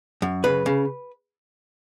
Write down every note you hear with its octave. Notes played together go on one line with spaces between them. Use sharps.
F#2
C#3 B4
C#3